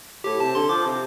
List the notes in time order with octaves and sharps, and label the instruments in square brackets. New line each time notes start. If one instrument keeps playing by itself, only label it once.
[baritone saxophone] A2 [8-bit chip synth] G4
[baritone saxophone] C3 [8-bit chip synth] A5
[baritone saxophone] D3 [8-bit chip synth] C6
[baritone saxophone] F3 [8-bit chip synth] D6
[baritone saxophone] C3